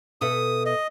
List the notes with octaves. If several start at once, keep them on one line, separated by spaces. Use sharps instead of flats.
B2 A4 E5 D#6
D#5